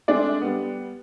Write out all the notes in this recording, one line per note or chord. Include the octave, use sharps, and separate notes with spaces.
G#3 A3 C4 D4 D5
G3 B3